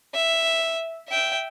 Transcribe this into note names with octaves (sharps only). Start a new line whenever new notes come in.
E5
E5 G5